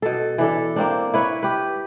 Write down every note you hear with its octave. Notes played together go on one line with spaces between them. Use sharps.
B2 A4
E3 D4 A4
A#3 C4 D4
E4 B4 C#5
G4 B4